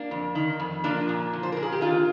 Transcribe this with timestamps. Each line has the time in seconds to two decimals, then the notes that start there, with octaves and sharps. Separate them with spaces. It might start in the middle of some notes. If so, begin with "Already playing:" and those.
Already playing: A#3 D4
0.11 F2
0.35 D#3
0.60 F2
0.84 F3 A#3 D4
1.09 A#2
1.33 F3
1.43 C5
1.52 A#2 A#4
1.62 G#4
1.72 G4
1.81 D#3 D4 F4